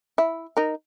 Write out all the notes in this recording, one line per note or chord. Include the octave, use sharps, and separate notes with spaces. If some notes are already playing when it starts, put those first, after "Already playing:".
E4
D#4 A#4